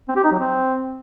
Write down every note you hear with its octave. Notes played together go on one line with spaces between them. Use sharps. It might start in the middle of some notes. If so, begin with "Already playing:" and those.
C4
G4
D#4
F#3
C4